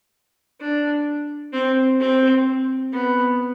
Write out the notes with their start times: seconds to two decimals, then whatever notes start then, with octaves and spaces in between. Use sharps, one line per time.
0.60 D4
1.53 C4
2.00 C4
2.92 B3